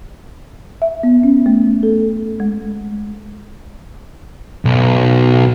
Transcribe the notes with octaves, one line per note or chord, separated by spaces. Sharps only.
E5
B3
C#4
A3
A4
G#3
B1